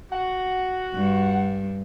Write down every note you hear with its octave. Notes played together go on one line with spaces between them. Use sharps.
F#4 F#5
G2